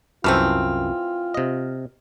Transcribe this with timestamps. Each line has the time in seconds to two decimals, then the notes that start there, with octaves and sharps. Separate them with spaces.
0.24 C2 F#2 E3 A3 C4 F4 F6
1.34 C3 D#5